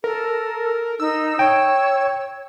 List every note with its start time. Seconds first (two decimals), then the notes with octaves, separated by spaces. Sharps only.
0.04 A4 A#4
1.00 D#4 E6
1.39 C#5 G5